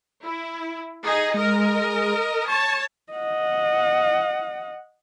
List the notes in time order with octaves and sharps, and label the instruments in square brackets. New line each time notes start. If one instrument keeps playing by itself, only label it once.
[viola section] E4
D#4 G#4
[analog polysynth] G#3 [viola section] A#4 D#5
[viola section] C#5 A5 [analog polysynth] C#6
[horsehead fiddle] D#5 F#5